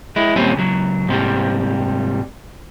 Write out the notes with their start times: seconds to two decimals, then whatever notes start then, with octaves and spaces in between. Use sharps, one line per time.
0.16 G#3 E4
0.36 D#2 A#2 G3 C4 C#4
0.56 C#2 F#3
1.09 G#2 C3 G3